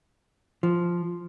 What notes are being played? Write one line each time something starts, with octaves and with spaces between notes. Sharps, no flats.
F3